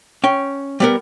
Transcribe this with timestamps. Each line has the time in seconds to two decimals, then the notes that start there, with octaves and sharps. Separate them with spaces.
0.24 C#4 G5
0.80 G3 B3 A#4